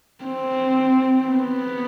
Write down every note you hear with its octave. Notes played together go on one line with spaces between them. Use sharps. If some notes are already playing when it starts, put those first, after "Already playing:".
C4
B3